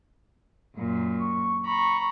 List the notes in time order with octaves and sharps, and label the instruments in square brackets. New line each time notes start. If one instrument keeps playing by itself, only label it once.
[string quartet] F#2 A#2
[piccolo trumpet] C#6
[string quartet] A#5 B5 [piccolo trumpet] C#6